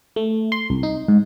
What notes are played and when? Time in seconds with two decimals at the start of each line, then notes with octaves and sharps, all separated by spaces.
0.16 A3
0.52 C6
0.70 C2
0.83 D#4
1.08 G#2